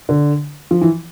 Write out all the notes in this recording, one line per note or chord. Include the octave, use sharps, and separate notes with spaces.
D3
F3
E3